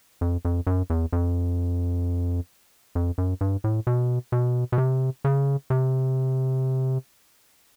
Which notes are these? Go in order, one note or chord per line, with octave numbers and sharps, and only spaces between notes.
F2
F2
F#2
E2
F2
F2
F#2
G2
A2
B2
B2
B2
C3
C#3
C3